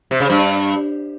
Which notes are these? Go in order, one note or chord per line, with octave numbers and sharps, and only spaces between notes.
C3
C#3
G2